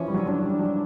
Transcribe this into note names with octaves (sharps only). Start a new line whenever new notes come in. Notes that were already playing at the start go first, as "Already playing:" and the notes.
Already playing: E3 F3 C#4
G3
F#3
F#3 D4
G3
F#3